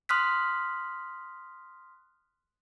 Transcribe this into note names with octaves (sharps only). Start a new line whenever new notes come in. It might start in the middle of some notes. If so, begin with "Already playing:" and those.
C6 D#6 F6 F#6 B6